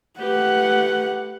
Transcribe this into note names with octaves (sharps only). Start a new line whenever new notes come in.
A3 G4 B4 F#5